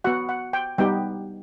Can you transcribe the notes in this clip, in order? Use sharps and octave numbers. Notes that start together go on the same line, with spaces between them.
B3 F#4 F#5
F#5
G5
G3 B3 D#4 G4 G5